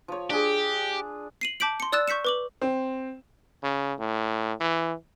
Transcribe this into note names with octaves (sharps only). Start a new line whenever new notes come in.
F3 C#5
D4 G4 G#4
C7 D#7 F#7
A5 D6 G6 B6 D7 F#7
C6 C#7
D5 D#6 E6 F#6 A6 E7
C#6 G6 B6 C#7 E7
B4 D6 F#7
C4
C#3
A2
E3